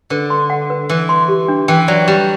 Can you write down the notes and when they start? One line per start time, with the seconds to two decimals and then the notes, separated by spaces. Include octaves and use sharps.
0.10 D3 B4
0.30 C6
0.50 F#5
0.70 B4
0.89 E3 B4
1.09 C6
1.28 G4
1.48 D4
1.68 E3 G5
1.88 F#3 D5
2.07 G3 G4